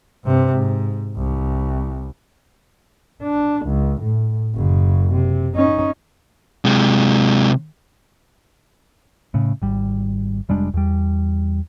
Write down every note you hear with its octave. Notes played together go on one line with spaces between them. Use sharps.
G2 C3
G#2
C2
D4
C#2
A2
F#1 C#3
C3
C#4 D#4
C3 G#3
A2 C#3
G#1 G3
F1 G3 G#3 D4
E2 G3